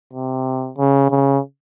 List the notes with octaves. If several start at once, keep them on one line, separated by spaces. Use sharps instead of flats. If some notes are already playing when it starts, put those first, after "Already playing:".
C3
C#3
C#3